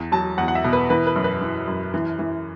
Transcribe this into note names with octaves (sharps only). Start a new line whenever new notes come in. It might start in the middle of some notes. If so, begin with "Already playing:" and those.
Already playing: E2
F#3 A5
E2 F#5
F#5
E5
B2
B4
E3 B4
B4
F#2
B4
E3
F#2
E3
E3